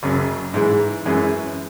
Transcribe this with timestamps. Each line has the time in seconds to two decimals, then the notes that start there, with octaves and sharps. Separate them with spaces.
0.03 F#1 F#2 C#3 F#3
0.54 G#2 E3 G#3
1.06 F#2 E3 G#3 C#4